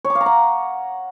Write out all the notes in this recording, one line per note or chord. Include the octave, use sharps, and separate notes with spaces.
C#5
D6
F5
A#5
F#5